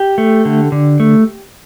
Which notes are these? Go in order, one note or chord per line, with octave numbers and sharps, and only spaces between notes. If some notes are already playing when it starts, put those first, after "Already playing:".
Already playing: G4
A3
D3
D3
A3